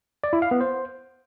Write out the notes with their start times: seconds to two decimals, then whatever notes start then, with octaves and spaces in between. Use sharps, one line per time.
0.24 D5
0.33 E4
0.42 F5
0.51 B3
0.61 C5